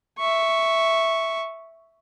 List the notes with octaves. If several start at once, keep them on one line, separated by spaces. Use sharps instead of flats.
E5 C#6